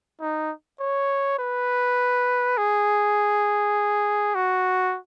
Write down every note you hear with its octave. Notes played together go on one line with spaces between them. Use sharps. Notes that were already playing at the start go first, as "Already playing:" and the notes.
D#4
C#5
B4
G#4
F#4